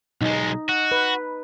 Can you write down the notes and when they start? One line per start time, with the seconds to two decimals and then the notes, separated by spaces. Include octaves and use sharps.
0.21 B1 G#3 D#4
0.69 F#4
0.92 B4